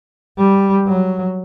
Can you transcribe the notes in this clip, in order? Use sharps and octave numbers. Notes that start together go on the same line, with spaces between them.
G3
F#3